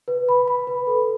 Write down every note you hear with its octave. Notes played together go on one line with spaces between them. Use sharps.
B4
B5
B5
B4
A4